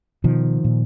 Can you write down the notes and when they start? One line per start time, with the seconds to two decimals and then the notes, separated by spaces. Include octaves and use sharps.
0.24 B2 D#3 F3
0.64 A#2